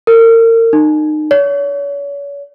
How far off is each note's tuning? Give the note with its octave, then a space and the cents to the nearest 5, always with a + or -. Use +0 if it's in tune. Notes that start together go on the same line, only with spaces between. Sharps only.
A#4 -35
D#4 -30
C#5 +35